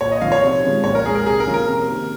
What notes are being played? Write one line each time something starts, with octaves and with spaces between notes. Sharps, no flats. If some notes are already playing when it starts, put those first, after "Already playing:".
A#2 C#5
D#5
F3 C4 D#4 F5
C#5
C3
F3 G#3 C#4
A#2 C#5
A#4
G#3 D#4 G#4
A#4
C3 G#4
A#4
F3 A#3 C#4
A#4
C3
D#3 A#3